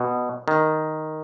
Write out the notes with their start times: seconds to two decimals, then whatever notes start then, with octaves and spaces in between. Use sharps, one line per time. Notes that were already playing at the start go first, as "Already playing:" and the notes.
Already playing: B2
0.48 D#3